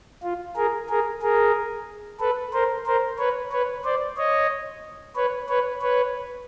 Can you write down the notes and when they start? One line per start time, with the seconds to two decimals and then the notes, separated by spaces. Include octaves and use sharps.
0.23 F4
0.56 G#4 A#4
0.89 G#4 A#4
1.22 G#4 A#4
2.20 A4 B4
2.53 A#4 C5
2.86 A#4 C5
3.19 B4 C#5
3.52 B4 C#5
3.84 C5 D5
4.17 C#5 D#5
5.16 B4 C#5
5.49 B4 C#5
5.82 B4 C#5